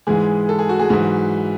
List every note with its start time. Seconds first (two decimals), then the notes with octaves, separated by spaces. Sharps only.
0.07 G#2 E3 G#3 G#4
0.49 A4
0.59 G#4
0.69 F#4
0.80 G#3 G#4
0.90 G#2 E3 F#3 F#4